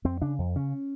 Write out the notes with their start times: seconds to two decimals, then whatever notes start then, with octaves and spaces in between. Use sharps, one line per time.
0.04 F2 C4
0.22 C#3 D4
0.39 F2
0.55 C#3 C#4